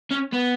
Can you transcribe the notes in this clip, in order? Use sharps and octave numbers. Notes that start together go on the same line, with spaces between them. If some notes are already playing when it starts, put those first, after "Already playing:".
C#4
B3